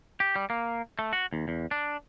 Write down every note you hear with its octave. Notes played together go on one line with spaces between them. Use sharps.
G4
G3
A#3
A3
F#4
D#2
E2
D4